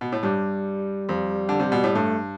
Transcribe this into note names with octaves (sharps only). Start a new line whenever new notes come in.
B2
A2
G2 G3
F2
D3
C3
B2
A2
G2 A3